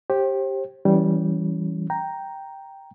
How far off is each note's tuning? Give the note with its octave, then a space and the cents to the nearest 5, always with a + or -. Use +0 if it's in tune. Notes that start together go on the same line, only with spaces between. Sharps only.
G4 +0 C5 +35
E3 +0 G3 -10 C#4 +15
G5 +0 A#5 +0